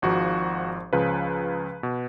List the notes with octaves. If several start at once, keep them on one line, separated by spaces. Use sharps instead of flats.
G#1 G#2 F3 F#4
C#2 C#3 F3 B4
B2